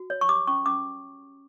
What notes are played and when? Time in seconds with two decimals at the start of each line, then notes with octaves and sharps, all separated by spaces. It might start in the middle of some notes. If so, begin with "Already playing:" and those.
Already playing: F#4
0.10 C#5
0.21 C#6
0.29 G4 D6
0.48 C#4 C#6
0.66 C#4 D6